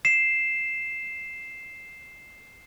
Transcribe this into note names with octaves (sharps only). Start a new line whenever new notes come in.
C7 E7